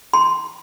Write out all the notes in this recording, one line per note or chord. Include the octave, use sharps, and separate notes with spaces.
C6